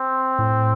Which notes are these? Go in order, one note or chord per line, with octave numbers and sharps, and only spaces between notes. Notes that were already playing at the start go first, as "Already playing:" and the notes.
Already playing: C4
A2